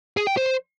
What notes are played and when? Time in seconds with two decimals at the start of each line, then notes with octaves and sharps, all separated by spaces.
0.17 G#4
0.27 G5
0.37 C5